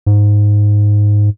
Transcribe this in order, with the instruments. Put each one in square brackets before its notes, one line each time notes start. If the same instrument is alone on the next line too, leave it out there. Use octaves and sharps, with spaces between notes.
[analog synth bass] G#2